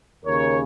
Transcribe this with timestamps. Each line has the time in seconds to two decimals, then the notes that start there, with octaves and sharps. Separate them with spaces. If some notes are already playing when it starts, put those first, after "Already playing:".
0.25 D#2 C#3 A#4 C#5